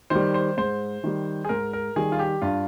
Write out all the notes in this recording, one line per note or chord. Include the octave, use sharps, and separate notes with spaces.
D#3 G3 C5
C5
G#2 C5
D#3 G3
G#4
G#2 A#4
A#4
D#3 G3 G#4
F4
G4
G2 F4